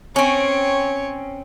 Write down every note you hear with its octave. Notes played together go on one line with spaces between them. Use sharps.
C4 C#4 C#5